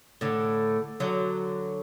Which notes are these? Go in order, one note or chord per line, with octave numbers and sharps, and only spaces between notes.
A2 D3
D3 F#3